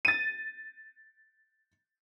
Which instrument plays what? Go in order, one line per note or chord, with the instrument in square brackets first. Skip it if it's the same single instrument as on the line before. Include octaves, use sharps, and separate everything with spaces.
[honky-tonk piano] A6 D#7